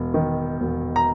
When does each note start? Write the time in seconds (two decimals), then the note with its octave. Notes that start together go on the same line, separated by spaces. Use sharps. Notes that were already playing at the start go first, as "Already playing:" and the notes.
Already playing: E1
0.14 D#3
0.61 E1
0.96 A#5